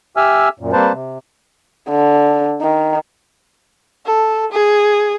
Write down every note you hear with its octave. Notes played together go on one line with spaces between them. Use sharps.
G4 E5 G#5 E6 F6
F#2 A#2
G3 A#3 C4 B4 C5 A5
C3
D3
D#3
A4
G#4